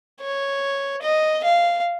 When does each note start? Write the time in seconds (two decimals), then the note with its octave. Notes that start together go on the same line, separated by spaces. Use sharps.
0.21 C#5
1.03 D#5
1.45 F5